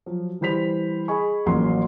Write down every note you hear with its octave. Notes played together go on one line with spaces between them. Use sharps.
F3 F#3
E3 G3 C5 B5 B6 F7
G#4 D#5 G#5 B5 C#6
A1 F3 F#3 A#3 C6